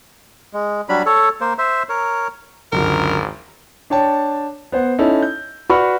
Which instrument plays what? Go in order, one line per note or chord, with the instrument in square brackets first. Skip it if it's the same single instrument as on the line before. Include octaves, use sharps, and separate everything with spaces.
[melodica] G#3
F#3 G3 D4 B5
A4 C#5
A#3 C5
C5 E5
A#4 C#5
[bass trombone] G#1 [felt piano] C#2 F#2 D3 [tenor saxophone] A#4
[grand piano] D4 C#5 G5 A5
B3 C5 F#5
C#4 D#4 E4 A4
G6
F#4 B4 D5 B5 C#6 F6